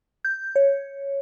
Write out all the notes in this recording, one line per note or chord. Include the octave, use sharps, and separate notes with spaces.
G6
C#5